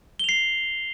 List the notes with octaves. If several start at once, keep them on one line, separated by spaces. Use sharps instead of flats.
C7 F7 G7